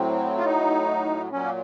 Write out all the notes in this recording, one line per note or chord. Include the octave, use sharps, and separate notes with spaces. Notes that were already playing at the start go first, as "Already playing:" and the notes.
Already playing: A2 F#3 C4
F4
D#4
A#2 F#3 C#4
A#3